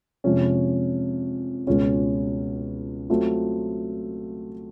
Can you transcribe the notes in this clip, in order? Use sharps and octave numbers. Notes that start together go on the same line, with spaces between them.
F2 C3 F3 G#3 C#4
C#2 B2 G#3 C#4 F4
F#3 A3 C4 F4